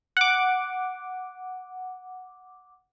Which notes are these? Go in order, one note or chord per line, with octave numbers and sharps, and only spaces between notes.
F#5 D6